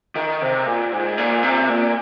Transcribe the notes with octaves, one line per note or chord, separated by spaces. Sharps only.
D#3
C3
A#2
G#2
A#2
C3
A#2